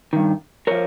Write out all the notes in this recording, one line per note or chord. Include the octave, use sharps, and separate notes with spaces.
G2 D#3
F3 A#4 C#5